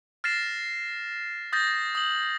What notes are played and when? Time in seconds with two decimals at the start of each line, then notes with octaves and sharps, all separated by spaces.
0.24 F6 A6 A#6 C7 E7
1.53 D#6 G6 A6 A#6
1.95 D#6 F#7